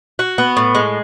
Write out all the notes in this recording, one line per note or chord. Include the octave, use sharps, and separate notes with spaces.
F#4
B3
A2
G#3